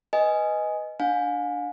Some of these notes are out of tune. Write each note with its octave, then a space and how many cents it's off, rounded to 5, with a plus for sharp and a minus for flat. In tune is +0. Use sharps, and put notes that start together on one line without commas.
B4 +0 D#5 +5 G#5 +0
D4 +0 F5 +45 G#5 +0